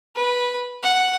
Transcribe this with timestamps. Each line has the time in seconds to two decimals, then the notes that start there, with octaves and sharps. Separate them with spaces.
0.16 B4
0.83 F#5